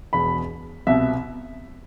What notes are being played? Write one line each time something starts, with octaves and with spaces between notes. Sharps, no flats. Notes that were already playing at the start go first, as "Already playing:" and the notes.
E1 E2 B2 B5
C2 B2 E5